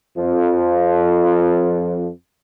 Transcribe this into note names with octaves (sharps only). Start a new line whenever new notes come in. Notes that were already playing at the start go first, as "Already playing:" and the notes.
F2 F3